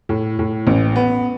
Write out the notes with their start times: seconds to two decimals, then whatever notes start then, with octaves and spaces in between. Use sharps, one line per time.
0.09 A2
0.39 A2
0.67 A1
0.96 B3